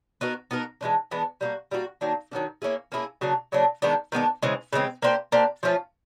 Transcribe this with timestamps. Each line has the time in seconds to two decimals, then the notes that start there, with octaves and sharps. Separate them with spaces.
0.21 B3 D#4 F#4 A#4
0.51 B3 D#4 F#4 A#4
0.81 E3 G#3 B3 D4
1.11 E3 G#3 B3 D4
1.41 G3 A#3 D#4 F#4
1.71 G3 A#3 D#4 F#4
2.01 D#3 F#3 A#3 D4
2.32 D#3 F#3 A#3 D4
2.62 A#3 C#4 E4 G#4
2.92 A#3 C#4 E4 G#4
3.21 C#3 F#3 A#3 D4
3.52 C#3 F#3 A#3 D4
3.82 D#3 G#3 B3 D4
4.12 D#3 G#3 B3 D4
4.43 C#3 E3 G#3 C4
4.73 C#3 E3 G#3 C4
5.02 A#3 D4 G4 C5
5.32 A#3 D4 G4 C5
5.63 F3 A3 C#4 F4